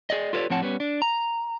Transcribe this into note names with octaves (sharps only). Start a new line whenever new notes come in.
G#4 D5 D#5
F4 G4 A4 B4 C#5 D5
A2 F3 C4 C#5 F#5 A5
G3 B3 C#4
D4
A#5